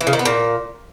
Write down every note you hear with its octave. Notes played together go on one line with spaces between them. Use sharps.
E3
C#3
D#3
B3
A#2